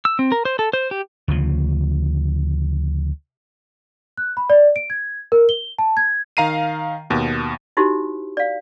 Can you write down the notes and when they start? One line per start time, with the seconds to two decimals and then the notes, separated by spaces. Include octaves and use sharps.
0.05 E6
0.19 C4
0.32 A#4
0.45 C5
0.59 A4
0.73 C5
0.91 G4
1.28 D2 C#3 F3
4.17 F#6
4.37 B5
4.50 D5
4.76 D7
4.90 G#6
5.32 A#4
5.49 G7
5.79 A5
5.97 G#6
6.37 D#3 F5 A#5 C7 D#7
7.10 D#2 B2
7.77 D#4 E4 F#4 G4 C5
8.37 D5 F5